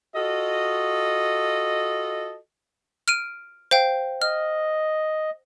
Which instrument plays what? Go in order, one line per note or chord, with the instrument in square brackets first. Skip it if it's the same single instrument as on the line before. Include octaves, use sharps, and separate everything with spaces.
[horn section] F4 F#4 A4 D#5
[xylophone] F6 D7 D#7
C5 F5 G5
[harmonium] D#5 [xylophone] F6